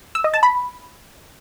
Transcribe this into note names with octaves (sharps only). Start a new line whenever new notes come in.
E6
D#5
A5
B5